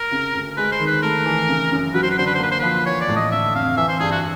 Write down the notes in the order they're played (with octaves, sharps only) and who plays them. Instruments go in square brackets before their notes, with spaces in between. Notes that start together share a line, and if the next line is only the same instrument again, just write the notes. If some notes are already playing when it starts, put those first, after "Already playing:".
Already playing: [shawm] A#4
[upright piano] C#3
D2
[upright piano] G#3 [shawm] B4
[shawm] C5
[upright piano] D#3
[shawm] B4
[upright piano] A3 [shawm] A#4
[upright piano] E3
C#3
F#2
[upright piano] F#3 [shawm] B4
[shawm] C5
B4
[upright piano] D3 [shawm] C5
[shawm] B4
C5
[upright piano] A#3 [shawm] B4
[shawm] C5
[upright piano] F3 [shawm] B4
[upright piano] E3 [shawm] C#5
[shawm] D5
[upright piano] A2
[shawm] D#5
[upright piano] D3 [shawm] E5
[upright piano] F2 [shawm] F5
[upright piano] E3 [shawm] E5
[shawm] C5
[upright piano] G2 [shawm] G#4
[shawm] F#4